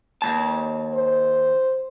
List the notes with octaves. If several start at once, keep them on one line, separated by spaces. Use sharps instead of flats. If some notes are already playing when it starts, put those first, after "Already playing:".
D#2 G#2 A5
C5